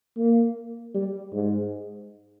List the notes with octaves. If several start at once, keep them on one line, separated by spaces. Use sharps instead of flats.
A#3
G3
G#2